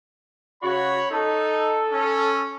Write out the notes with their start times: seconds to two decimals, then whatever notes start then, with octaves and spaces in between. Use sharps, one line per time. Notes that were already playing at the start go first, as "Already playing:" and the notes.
0.63 C#3 F#4 C#5 B5
1.11 D#4 A4
1.92 C#4